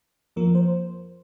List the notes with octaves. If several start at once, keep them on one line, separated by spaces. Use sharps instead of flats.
F2 F3 A#3 A#4
C5